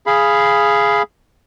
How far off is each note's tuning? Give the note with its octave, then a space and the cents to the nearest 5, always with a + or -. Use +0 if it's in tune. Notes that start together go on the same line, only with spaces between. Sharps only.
G#4 +0 F5 -15 B5 +0